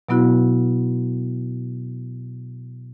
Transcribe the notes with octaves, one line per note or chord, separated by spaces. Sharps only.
B2 F#3 B3 E4 F#4